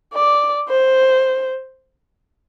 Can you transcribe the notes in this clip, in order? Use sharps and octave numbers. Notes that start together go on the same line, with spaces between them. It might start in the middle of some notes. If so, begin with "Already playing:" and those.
D5
C5